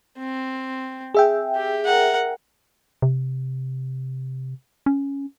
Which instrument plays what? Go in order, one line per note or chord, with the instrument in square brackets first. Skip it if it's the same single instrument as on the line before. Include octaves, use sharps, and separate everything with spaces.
[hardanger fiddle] C4
[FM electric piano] G#4 E5 G5
[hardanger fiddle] G4
A#4 F#5
[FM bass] C3
C#4